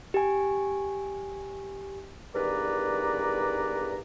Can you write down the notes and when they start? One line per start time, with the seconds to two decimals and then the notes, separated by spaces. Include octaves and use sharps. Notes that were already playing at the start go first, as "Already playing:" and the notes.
0.14 G4 G#5
2.34 E2 G2 D#3 B4 D5 A#5